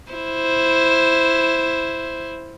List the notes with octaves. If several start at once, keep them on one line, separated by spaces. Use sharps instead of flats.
E4 C5